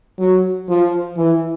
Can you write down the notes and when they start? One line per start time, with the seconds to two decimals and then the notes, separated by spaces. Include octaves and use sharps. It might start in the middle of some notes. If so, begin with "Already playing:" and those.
0.19 F#3
0.68 F3
1.17 E3